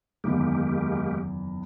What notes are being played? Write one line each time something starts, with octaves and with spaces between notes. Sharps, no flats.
F#1 E2 D#3 G#3 A#3 G4